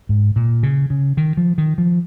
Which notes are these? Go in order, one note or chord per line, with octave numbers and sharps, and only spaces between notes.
G#2
A#2
C#3
C#3
D#3
F3
D#3
F3